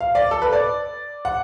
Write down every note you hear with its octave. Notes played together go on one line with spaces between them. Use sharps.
F5
D5
A4
B4
D5
F#5